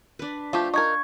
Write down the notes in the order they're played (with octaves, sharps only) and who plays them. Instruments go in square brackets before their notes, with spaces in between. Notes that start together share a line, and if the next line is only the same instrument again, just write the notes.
[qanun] D4 B4
[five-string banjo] F3 A3 G4 [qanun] F4
[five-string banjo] D#4 A#4 [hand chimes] C#6 G#6